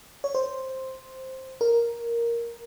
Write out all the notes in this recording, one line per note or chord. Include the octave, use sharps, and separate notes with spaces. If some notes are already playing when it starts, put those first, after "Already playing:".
C#5
C5
A#4